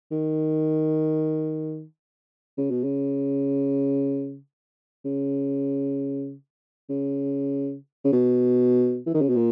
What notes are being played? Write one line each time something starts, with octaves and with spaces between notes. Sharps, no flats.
D#3
C#3
B2
C#3
C#3
C#3
C#3
B2
E3
D#3
C#3
B2
A#2